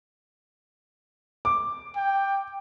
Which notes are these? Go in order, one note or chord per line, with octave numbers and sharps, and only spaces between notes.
D6
G5